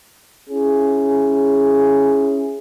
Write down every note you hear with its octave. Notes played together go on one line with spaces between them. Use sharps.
C#4 E4 G#4